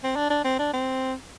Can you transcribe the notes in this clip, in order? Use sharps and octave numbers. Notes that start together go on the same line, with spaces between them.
C4
D4
D4
C4
D4
C4